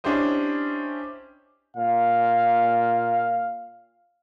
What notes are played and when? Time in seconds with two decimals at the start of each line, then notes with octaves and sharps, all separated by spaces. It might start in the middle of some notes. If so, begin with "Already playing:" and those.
0.04 C#4 D4 E4 G4 C5 D#5
1.77 A#2 F5